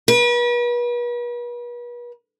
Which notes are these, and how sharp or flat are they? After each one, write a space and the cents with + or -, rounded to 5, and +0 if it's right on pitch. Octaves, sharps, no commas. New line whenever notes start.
B4 -40